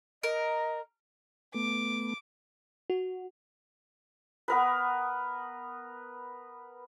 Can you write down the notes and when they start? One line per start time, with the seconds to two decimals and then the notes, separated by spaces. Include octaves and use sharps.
0.23 A#4 D#5
1.54 A3 B3 D6
2.90 F#4
4.48 B3 A#4 B4